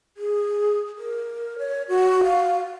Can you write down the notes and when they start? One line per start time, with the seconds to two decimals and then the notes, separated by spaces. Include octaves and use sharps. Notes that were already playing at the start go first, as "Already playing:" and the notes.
0.17 G#4
0.98 A#4
1.59 C#5
1.89 F#4
2.24 F5